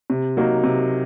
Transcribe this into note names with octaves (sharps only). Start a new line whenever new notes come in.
C3
F#3 A#3 D#4
C3